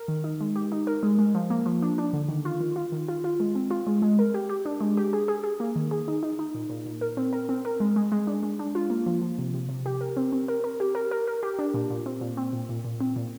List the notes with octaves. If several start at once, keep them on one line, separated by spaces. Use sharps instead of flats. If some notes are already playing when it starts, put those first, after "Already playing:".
Already playing: A#4
D#3
D#4
G#3
G4
D#4
A#4
G#3
G#3
F3
A#3
F3
D4
D4
D3
D#3
F4
D#3
F4
D#3
F4
F4
G#3
C4
F4
G#3
G#3
A#4
G4
G4
D4
G#3
G4
G#4
G#4
G#4
A#3
D#3
G#4
D#4
D#4
D#4
A#2
A#2
A#2
A#4
C4
A#4
C4
A#4
G#3
G#3
G#3
D4
G#3
D4
F4
A#3
F3
F3
C3
C3
C3
G4
A#4
C4
C4
A#4
A#4
G4
A#4
A#4
A#4
G4
D4
A#2
A#2
C4
A#2
C4
A#2
A#2
A#2
C4
A#2